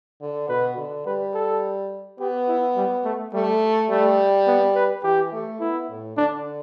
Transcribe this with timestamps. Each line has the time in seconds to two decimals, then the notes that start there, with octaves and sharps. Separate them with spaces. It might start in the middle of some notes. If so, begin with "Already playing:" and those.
0.21 D3
0.49 B2 B4
0.77 D3
1.06 G3 B4
1.34 A4
2.19 B3 G4
2.48 E4
2.76 G3
3.05 A3
3.33 G3 A3
3.90 G3 A3
4.47 B3
4.75 B4
5.03 E3 G4
5.32 A3
5.60 B3 E4
5.89 A2
6.17 D3 D4